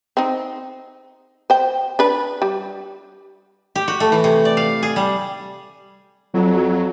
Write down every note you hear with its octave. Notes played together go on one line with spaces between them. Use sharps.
C4 D#4
C5 G5
D4 B4
G3
G4
F#4
A3
E3
C3
D5
F5
G#4
G3
F2 F#3